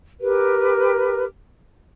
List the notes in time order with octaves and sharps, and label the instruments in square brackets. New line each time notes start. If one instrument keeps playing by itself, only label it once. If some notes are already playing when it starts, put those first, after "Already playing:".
[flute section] G4 A#4 B4